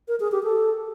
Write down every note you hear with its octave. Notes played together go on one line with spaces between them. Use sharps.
A#4
G#4
G4
A4